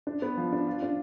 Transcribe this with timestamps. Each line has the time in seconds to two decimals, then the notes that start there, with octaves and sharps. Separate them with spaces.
0.07 D4
0.22 B3
0.37 F3
0.52 D4
0.67 F4
0.82 D4